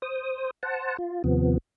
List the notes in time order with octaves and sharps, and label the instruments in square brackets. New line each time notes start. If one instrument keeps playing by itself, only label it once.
[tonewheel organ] C5 D#6
C5 F#5 A5
F4
D#2 C3 F3 B3